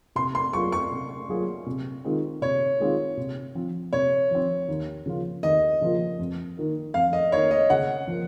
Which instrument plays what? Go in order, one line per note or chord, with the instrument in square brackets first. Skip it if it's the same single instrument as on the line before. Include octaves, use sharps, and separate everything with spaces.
[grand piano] C3 [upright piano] C6
[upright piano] C6
[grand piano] F#3 A#3 F4 G#4 [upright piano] C#6
[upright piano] C#6
[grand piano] C3
F#3 A#3 F4 G#4
C3
D#3 G#3 C4 F4
[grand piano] C3 [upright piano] C#5
[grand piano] D#3 G#3 C4 F4
C3
F3 C4
[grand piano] C3 [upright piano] C#5
[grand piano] F3 C4
D#2
C#3 F3 A#3 F4
[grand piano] D#2 [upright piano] D#5
[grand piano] C#3 F3 A#3 F4
F2
D#3 A#3
[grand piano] F2 [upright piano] F5
[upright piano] D#5
[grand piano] D#3 A#3 [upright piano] C#5
[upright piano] D#5
[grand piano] C#3 [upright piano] F#5
[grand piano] F3 A#3